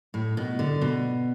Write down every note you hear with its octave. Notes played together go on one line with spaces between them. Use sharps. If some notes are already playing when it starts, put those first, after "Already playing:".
A2
B2
D3
B2